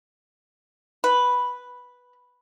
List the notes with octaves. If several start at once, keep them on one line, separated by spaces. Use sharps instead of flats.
B4